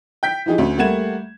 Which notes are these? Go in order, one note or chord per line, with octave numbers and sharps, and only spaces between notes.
G5 G6 B6
E3 F3 D#4 G4 G#4
D2 C#4
G3 A3 A#3 F#5 G#6 E7